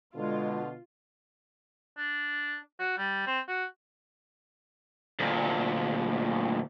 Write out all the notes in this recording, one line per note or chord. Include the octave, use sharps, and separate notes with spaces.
B2 D3 G#3 F4
D4
F#4
G3
C4
F#4
D2 A#2